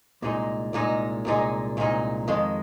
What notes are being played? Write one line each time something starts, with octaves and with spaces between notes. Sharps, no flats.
C2 A#2 G#3 D#4
C2 A#2 G#3 D#4
C2 A#2 G#3 D#4
C2 A#2 G#3 D#4
F2 D#3 G#3